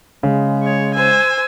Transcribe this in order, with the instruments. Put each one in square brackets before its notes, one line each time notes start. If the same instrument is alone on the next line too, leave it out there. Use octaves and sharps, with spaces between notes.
[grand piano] C#3 [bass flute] G#3
[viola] C#5
[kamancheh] C5 E6 [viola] G#5